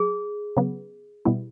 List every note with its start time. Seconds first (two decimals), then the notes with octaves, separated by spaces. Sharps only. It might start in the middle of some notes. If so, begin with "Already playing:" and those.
Already playing: F#3 G#4
0.57 C#3 F#3 B3
1.25 B2 G3 B3 E4